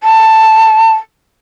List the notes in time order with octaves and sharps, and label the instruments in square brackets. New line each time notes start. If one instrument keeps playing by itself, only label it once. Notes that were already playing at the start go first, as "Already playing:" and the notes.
[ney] A5